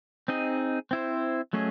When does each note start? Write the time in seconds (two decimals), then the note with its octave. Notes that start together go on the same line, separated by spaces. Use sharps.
0.28 C4 D#4 G#4 D#5
0.91 C4 E4 C5
1.53 F#3 A3 C#4 G#4 D#5